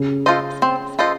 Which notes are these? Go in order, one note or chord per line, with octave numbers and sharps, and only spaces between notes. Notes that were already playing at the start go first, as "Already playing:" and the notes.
Already playing: C#3
F4 A4 C5 D#5
C4
F4 A4 C5 D#5